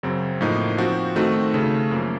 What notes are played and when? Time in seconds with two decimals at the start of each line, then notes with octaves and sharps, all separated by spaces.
0.03 F#2 C#3 F#3 C4
0.41 A2 F3 A#3 D#4
0.78 F3 C4 F#4
1.16 D#3 A3 C4 D#4 F#4
1.54 C#3 A3 C#4
1.91 F#2 F3 A#3